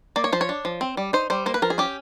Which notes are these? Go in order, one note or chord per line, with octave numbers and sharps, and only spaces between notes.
A#3 D5
C#5
F3 C5
C#5
D4
F3
C4
G3
D#4 C5
G3 C5
A#3 C5
B4
F3 A#4
G#4
C#4 G4